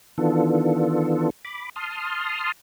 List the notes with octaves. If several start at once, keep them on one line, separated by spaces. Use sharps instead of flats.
D#3 E3 B3 D4 F4 A4
B5 D6
A5 C6 D#6 F6